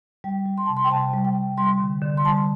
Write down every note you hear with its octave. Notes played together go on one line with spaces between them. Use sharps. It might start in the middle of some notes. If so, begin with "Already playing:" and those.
G3 G5
G3
C6
C3 A5
C6
G5
C3 A5
G3
G5
C3
G3 C6
D3
D3
C6
G3 A5